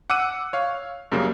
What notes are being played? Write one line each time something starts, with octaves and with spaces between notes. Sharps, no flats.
F#5 D6 E6 F#6 D#7
C#5 F5
F#2 C#3 G3 A#3